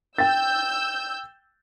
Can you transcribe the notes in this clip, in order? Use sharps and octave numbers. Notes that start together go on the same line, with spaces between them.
G5 E6 G6 A6